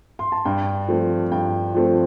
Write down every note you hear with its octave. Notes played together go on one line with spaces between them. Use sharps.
C6
A5
G2 G5
F3 A3 C4
G2 G5
F3 A3 C4